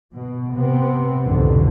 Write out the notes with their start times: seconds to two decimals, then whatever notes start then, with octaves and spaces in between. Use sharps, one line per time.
0.14 B2
0.54 C3 B3 C4
1.25 C2 F2 G#2 B2 D3